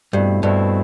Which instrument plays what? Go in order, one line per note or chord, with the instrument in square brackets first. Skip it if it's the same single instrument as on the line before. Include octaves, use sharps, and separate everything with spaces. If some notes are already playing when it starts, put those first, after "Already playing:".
[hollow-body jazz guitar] G2 [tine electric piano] B2 A3 C4 E4
[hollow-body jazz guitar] G2 [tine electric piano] B2 A3 C4 E4